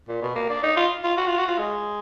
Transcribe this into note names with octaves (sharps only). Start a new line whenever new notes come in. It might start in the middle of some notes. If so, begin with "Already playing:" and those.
A#2
B2
A#3
D4
D#4
F4
F4
F#4
F4
F#4
F4
G#3